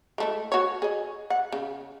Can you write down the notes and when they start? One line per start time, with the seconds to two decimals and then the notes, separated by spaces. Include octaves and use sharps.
0.18 G#3 A3 E4
0.52 F#4 C#5
0.82 G#4 D#5
1.30 F#5
1.52 C#3